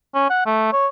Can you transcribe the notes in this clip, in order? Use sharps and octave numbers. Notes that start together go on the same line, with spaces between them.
C#4
F#5
A3
C#5